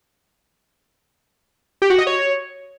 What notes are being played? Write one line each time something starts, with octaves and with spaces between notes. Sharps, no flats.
G4
F#4
D#5
C#5